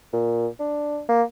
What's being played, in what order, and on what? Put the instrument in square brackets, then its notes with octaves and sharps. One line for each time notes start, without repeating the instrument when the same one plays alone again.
[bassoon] A#2
D4
A#3